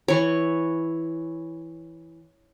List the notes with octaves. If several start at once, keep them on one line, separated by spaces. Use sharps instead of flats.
E3 C#5